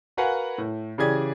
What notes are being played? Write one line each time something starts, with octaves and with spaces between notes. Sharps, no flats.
F#4 A#4 B4 F5 F#5 G#5
A2
C#3 E3 G4 G#4 D5 G#6